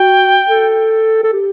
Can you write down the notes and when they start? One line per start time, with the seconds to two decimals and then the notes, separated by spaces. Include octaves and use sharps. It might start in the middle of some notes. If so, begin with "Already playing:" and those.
Already playing: F#4 G5
0.49 A4
1.24 A4
1.33 G4